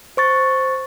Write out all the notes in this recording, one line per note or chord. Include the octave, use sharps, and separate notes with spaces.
C5 C#6 A6